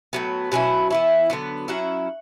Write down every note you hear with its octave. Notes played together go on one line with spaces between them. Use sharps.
A2 F#3 B3
B2 F#3 C#4 E4
E3 B3 E4
D3 F#3 B3
F#3 C#4 E4 F#5